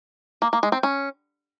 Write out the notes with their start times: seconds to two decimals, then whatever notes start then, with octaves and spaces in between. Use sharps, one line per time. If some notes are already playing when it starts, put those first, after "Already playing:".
0.42 A#3
0.53 A#3
0.63 G#3
0.72 C4
0.83 C#4